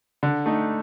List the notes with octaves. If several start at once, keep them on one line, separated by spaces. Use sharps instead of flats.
D3
A3 D#4